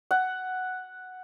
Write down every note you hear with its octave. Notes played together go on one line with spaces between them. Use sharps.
F#5